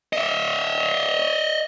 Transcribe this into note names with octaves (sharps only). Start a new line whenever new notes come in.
D#5 E5